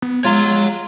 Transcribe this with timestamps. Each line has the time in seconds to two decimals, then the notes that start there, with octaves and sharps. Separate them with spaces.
0.02 B3
0.24 G#3 F4 C#5 A#5